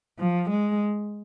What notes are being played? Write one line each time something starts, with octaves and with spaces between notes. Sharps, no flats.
F3
G#3